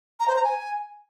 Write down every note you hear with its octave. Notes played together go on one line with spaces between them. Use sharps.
A#5
C5
A#5
G#5